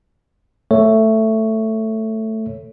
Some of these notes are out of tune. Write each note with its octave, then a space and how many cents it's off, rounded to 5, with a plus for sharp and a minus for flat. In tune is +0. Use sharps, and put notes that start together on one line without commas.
A3 +5 C#5 +0